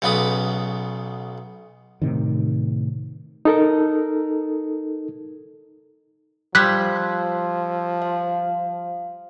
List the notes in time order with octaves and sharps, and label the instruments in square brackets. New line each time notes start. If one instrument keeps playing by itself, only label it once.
[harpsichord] B1 C#3 B3 D5 B5 D#6
[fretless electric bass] A2 C3 D#3
[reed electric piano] D#4 A4 A#4
[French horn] F3 [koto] G3 [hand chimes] C6 E6 G#6 [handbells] F#6 B6
[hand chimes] F5